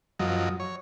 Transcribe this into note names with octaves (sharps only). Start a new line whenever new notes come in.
F#2 F3 F#3 D#5
C#5